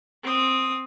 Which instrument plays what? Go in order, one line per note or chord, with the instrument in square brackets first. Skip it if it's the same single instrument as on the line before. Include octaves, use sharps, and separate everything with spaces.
[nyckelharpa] C4 D#6